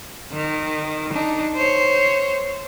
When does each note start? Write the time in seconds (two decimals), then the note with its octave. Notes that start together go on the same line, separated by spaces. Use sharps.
0.33 D#3
1.13 D4 D#4
1.56 C5 C#5